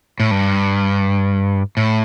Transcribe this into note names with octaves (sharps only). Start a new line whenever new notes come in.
A2
G2
A2